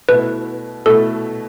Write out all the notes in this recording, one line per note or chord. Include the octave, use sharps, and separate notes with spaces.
B2 A3 E4 B4
B2 A3 E4 A4